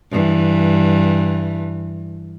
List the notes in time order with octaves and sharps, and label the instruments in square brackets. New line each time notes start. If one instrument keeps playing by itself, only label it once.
[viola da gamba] G2 E3